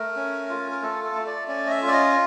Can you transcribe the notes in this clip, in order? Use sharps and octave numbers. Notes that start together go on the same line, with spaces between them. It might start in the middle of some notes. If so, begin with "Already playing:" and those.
Already playing: A3 A#4
C#4
F4
A#4
A3 A4
A4
A3
D5
C#4 D5
D#5
E5
F4
D5
D#5